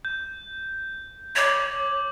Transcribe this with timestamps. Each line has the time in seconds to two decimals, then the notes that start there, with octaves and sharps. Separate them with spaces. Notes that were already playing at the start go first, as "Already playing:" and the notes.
0.05 G6
1.36 C#5 D6 F#7